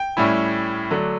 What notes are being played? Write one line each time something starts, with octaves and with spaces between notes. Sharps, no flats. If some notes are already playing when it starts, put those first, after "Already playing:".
Already playing: G5
A2 G3 C#4 E4
D3 F#3 A3 D4